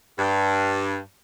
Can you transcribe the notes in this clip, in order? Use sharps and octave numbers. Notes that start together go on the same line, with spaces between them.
G2